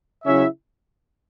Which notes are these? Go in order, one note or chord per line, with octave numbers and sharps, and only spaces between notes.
C#3 F#3 C#4 E4 E5